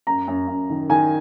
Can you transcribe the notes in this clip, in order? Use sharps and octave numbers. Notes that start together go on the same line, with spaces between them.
F#2 A#5
F#2
F#2
D#3
D#3 G#5